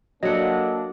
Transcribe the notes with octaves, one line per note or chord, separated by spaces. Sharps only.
F#3 A#3 D4 A4 D#5 F#5